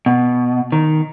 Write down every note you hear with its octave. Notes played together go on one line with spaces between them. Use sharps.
B2
D#3